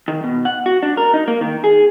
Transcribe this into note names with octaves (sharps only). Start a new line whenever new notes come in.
D#3
B2
F#5
F#4
D4
A#4
D#4
A#3
D#3
G#4